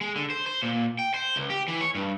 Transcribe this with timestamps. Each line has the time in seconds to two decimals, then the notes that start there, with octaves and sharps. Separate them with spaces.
0.01 G#3
0.16 D3
0.30 C5
0.46 C5
0.62 A#2
0.99 G5
1.14 C5
1.36 C#2
1.50 G4
1.68 E3
1.81 C#5
1.95 G2